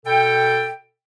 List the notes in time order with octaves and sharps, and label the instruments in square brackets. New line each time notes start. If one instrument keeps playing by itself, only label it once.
[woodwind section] B2 A4 G5